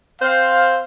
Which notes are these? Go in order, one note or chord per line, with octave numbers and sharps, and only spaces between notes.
C4 C5 F5